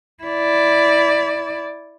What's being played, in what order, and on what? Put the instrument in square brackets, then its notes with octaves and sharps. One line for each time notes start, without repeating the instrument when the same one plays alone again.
[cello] E4 D5